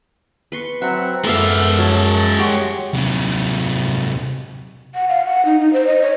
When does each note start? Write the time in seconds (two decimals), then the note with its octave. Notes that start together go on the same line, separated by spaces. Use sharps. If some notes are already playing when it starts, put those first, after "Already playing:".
0.52 B4 C6 C#6
0.82 F#3 C4 E5 F#5
1.24 F#2 G#3 B3 A4 D5 E5 F5
1.79 F#3 C#5 A5
2.39 F#4 G4 C#5 G#5 C6 C#6
2.94 C3 F#3
4.94 F#5
5.09 F5
5.25 F#5
5.45 D#4
5.60 D#4
5.73 C5
5.87 D#5
6.02 C#5